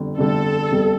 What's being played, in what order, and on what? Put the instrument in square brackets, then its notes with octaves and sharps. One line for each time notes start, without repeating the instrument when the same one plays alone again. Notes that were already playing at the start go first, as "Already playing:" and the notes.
Already playing: [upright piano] G1 F2 D3 G3
[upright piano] G1 F2 D3 G3 [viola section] A4
[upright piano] G1 F2 D3 G3